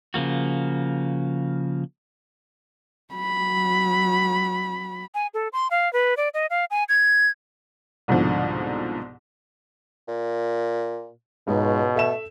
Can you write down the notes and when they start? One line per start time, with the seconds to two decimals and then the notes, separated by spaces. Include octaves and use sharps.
0.14 C#3 F3 A#3 F#4
3.14 F#3 B5
5.15 G#5
5.34 A4
5.53 C6
5.71 F5
5.93 B4
6.17 D5
6.34 D#5
6.50 F5
6.71 G#5
6.89 G#6
8.08 C2 G#2 B2 D3 F3
10.08 A#2
11.47 C#2 G#2 B2
11.95 A3 A4 E5 E7